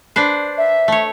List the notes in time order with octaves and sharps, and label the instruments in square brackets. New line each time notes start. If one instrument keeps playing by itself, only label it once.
[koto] D4 B4 C5
[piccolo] E5
[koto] A3 C#5